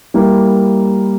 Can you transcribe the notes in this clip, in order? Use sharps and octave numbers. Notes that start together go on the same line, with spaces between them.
G3 A#3 E4 A#4